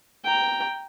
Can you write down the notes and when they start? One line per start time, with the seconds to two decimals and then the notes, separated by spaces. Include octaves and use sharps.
0.24 G5 A#5